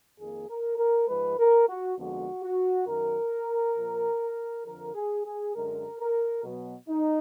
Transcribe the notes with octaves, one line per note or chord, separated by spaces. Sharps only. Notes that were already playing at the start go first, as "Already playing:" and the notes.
F2 D#3 A#3 G#4
A#4
A#4
G#2 F3 G#3 B4
A#4
F#4
F2 D3 F3 G#3 B3 F#4
F#4
F#2 D#3 F#3 A#4
A#2 F3 A#3
F2 D3 F3 A#4
G#4
G#4
F#2 D3 G#3 A#4
A#4
B2 F#3 B3
D#4